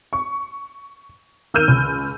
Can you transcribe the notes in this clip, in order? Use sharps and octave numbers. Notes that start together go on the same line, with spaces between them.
C#6
D#3 E6 F6 G6 D#7
C#2